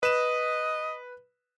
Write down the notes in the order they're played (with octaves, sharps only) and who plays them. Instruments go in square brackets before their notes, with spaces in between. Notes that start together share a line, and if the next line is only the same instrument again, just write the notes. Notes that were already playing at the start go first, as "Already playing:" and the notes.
[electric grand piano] B4 E7 [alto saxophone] D#5